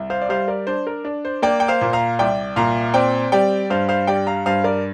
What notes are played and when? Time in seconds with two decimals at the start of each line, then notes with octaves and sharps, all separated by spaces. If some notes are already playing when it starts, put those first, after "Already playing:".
Already playing: C2
0.10 C5 F5
0.22 D5
0.29 G3 C5 F5
0.48 A#4 D5
0.67 D4 C5
0.87 A#4
1.05 D4
1.25 C5
1.42 A#3 D5 G5
1.60 G5
1.68 C5 F5
1.81 A#2
1.93 F5 A#5
2.19 C2 D5 G5
2.56 A#2 F5 A#5
2.94 C4 D5 G5
3.32 G3 D5 G5
3.70 G2 C5 F5
3.89 C5 F5
4.07 G3 D5 G5
4.27 F5 A#5
4.46 G2 C5 F5
4.64 A#4 D5